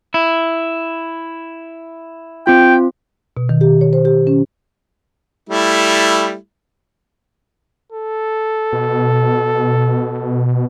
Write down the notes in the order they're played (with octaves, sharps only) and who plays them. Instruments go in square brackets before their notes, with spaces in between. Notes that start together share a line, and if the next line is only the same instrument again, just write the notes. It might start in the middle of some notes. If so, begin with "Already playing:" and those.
[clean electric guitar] E4
[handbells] C4 F4 [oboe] G5
[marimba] B2
D#3
G4
C#5
C5
G4
C#4
[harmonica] G3 A3 E4
[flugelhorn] A4
[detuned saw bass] B2